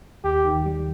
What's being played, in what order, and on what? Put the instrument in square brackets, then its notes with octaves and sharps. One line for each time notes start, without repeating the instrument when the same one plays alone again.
[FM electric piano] D#2 [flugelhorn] G4
[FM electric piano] D#3
G3